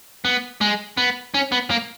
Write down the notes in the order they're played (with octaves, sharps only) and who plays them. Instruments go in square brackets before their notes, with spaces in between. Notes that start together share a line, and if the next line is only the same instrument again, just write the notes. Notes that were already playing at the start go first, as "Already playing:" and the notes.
[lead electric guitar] B3
G#3
B3
C#4
B3
A#3